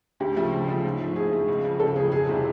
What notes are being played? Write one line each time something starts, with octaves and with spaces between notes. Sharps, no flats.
D2 G4
C#3 F3 A3
D2
C#3 F3 A3
G#2
F3 A3
G#2 G#4
F3 A3
C#2
C#3 F3
C#2 A4
C#3 F3 G#4
F1 G#4
C3 E3 G3